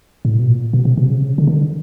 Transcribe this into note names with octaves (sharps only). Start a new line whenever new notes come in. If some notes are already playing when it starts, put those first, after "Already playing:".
A2
B2
A#2
B2
C3
B2
C3
C#3
C3
C#3
D3
D#3
D3